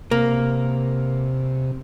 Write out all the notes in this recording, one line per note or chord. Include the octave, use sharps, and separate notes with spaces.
C3 A#3